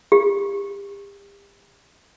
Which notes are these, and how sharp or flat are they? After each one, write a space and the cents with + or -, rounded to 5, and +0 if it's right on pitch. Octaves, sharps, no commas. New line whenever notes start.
G4 +35